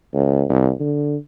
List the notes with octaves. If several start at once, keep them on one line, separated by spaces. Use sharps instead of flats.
C#2
C2
D3